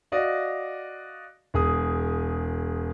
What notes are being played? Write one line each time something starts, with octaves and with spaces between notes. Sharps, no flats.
F#4 D5 D#5 F5
E1 G#4 D#6